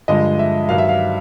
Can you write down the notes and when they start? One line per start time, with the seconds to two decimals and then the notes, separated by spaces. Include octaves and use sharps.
0.08 G2 D3 F3 G#3 D#5
0.39 E5
0.69 G2 D#3 F#3 F5
0.78 E5
0.89 F5